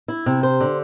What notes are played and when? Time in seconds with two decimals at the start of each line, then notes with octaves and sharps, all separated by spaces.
0.08 E4
0.26 C3
0.43 C5
0.60 D3